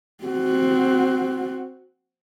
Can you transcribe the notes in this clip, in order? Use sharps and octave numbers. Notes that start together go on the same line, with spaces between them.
C4 F#4